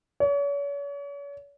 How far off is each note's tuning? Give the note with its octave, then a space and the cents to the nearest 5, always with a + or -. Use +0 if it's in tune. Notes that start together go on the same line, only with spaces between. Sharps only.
C#5 +40